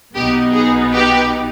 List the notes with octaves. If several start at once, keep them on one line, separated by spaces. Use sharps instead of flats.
B1 B2 B3 D#4 G4
G#4
G4 B4